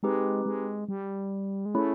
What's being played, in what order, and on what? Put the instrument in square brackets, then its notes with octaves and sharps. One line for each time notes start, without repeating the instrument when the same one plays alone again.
[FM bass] G#3 [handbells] C4 D#4 G4 B4
[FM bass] G#3
G3
G#3
[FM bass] A3 [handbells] C#4 E4 G#4 C#5